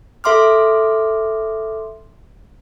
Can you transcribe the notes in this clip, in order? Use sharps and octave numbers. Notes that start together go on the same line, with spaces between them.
A4 E5 C6 D6 F6